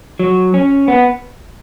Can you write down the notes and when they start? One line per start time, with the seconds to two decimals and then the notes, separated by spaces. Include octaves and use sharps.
0.19 F#3
0.54 C#4
0.88 B3